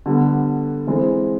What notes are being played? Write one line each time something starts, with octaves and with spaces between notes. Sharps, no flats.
D3 G3 B3
E3 G#3 C4